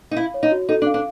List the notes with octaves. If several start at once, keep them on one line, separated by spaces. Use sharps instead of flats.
D#4
E4 F5
C#5
D#4
F#4
D#4 A4
D4
F5
D4